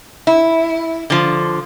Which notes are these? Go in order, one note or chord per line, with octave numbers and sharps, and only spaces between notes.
E4
D3 F3